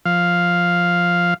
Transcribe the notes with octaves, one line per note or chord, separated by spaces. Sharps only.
F3 F5